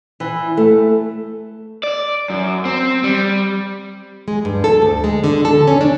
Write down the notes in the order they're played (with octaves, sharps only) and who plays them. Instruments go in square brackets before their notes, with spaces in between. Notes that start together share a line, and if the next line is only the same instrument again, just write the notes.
[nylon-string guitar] E3
A3
[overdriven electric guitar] D5
F#2
C4
G3
[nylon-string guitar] G#3
G2
A4
D2
G#3
D3
A4
C#4
D4